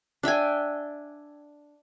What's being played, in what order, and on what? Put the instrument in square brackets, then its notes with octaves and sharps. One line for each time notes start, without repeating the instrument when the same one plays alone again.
[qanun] D4 E5 G5 G#5